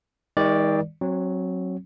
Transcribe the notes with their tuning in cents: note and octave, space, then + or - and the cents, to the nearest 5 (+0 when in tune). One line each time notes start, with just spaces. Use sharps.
D#3 +35 G#3 -40 D5 +0
F#3 +0 C4 +30